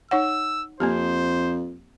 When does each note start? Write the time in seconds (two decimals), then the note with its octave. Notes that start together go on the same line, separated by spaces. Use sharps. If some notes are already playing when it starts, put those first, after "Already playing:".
0.11 D#4 C#5 F#5 E6
0.80 F2 A#3 C4 G4 C5